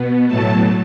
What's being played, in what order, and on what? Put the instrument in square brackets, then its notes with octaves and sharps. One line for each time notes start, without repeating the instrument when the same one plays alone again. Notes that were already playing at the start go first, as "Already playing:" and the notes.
Already playing: [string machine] B2 B3
A2 F#3 A3 A5